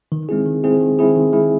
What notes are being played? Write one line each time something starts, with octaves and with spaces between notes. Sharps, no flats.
D#3
G#3 C4 E4 G#4
D#3
G#3 C4 E4 G#4
D#3
G#3 C4 E4 G#4
D#3
G#3 C4 E4 G#4